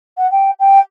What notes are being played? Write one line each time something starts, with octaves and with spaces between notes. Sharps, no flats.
F#5
G5
G5